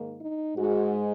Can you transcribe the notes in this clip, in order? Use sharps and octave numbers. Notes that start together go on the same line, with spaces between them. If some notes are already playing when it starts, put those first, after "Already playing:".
Already playing: G#2 D#3 A#3
D#4
G#2 G#3 F#4